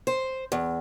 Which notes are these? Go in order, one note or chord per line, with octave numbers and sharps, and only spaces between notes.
C5
E2